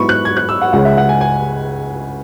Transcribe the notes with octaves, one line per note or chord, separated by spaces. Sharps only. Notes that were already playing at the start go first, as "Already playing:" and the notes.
Already playing: G#2 F#3 B3 E4 B5 C#6
F#6
G#6
F#6
E6
F#5
C#2 C#3 G#3 C#4 F#5
E5
F#5
G#5
G#5